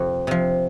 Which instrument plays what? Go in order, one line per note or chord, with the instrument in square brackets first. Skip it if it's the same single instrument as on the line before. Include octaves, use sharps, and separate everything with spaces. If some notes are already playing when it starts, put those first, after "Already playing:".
Already playing: [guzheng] F2 C3 F3
C3 F3